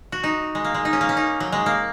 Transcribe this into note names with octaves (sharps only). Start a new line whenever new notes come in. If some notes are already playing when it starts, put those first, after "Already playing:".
F#4
D#4
G#3
A#3
G#3
D#4
C#4
A#3
C#4
D#4
F#3
G#3
A#3